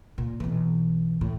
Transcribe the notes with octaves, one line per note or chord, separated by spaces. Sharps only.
A#2
B1 E3
A2